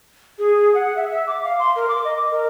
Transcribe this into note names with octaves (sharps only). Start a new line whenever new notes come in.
G#4
F#5
E5
E5
D6
F5
C6
A#4
D6
D#5
A#4